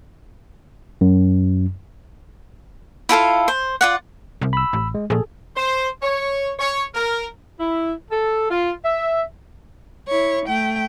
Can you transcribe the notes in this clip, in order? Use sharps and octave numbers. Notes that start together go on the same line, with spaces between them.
F#2
E4 F4 A4 F5
C5
F4 D5 F#5
C2
B5 E6
A1
G#3
A#1 G#4 A4
C5
C#5
C#5
A#4
E4
A4
F4
E5
E4 C#5
A3 G5